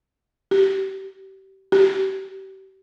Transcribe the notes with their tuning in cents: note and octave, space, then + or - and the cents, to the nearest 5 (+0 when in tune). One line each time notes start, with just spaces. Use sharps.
G4 -30
G4 -35